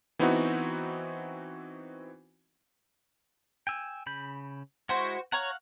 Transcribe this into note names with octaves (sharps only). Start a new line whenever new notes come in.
E3 B3 C4 D#4 E4 F#4
G5 G#5 E6
C#3 B5 G6
G#3 E4 F#4 C5
C#5 F5 F#5 A#5